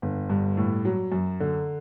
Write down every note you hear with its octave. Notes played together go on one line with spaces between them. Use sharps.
G1
G2
A2
F#3
F#2
D3